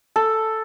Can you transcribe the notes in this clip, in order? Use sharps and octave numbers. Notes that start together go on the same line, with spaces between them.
A4